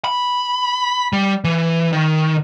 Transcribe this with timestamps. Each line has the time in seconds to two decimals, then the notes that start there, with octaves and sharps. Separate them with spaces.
0.04 B5
1.13 G3
1.44 E3
1.93 D#3